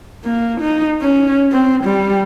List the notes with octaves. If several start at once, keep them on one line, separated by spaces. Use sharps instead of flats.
A#3
D#4
C#4
C4
G3